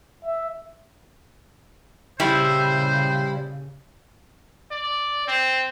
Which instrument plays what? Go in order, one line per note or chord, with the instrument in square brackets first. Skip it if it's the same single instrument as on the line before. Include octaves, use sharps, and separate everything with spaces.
[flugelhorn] E5
[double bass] A#2 C#3 [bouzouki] G3 [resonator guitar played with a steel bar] E4 [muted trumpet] C5
[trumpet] D5
C4